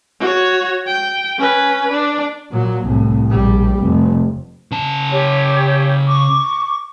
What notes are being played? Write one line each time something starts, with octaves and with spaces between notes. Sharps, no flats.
F#4 C#5
G5
C#4 B4
D4
A#2 F#3
C2 A2
A#1 G3
F1
C#3 A5
G4 C#5
C#6 D6